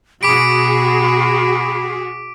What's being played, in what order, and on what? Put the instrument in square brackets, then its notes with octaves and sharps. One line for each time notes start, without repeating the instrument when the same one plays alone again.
[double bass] B2 [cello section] F#4 G#4 [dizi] B5 [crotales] D6 B6 D7